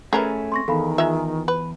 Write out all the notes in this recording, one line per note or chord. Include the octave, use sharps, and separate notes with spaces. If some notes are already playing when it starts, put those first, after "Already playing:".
A3 C#4 G#4 A#4 B4
C4 C6 C#6 A#6
E2 D#3 A4 F5 B5
G#3 F4 E5
B4